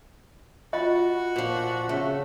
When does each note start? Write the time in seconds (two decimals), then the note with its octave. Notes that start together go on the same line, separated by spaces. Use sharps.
0.73 F4 F#4 D#5
1.36 A#2 F3
1.89 C#3 A3 C#4